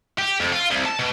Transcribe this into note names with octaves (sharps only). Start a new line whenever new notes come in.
G4
F2
F4
C2
A5
B2